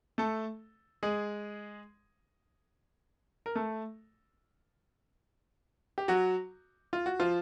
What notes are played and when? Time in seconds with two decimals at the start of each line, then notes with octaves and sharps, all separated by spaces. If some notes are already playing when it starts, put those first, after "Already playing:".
0.18 A3 A4
1.03 G#3 G#4
3.46 A#4
3.56 A3 A4
5.98 G4
6.08 F#3 F#4
6.93 F4
7.06 F#4
7.20 F3 F4